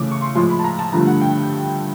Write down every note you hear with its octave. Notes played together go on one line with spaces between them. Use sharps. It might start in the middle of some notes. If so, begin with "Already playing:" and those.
Already playing: C#3 E3 A3 D6
C#6
C6
A2 F3 G#3 C6
B5
A5
A#5
A5
G2 D3 F3 A3 A#5
F#5
G5